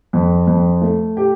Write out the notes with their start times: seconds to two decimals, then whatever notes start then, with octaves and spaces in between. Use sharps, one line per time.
0.13 F2
0.47 F2
0.82 A3
1.17 G4